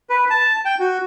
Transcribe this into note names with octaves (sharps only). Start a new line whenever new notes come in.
B4
A5
G5
F#4